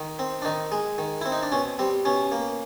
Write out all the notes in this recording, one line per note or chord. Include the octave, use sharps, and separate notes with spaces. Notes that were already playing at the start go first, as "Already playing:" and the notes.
Already playing: D#3
C4
D4
D#3 D#4
G#3
D#3
C4 E4
D#4
D4
B2 C#4
G3 C4
B2 C#4
A#3